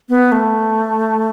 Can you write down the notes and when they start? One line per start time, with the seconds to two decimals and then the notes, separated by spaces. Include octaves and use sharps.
0.09 B3
0.32 A3